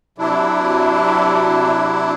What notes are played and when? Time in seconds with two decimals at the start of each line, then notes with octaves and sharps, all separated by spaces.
0.18 C3 F#3 D4 E4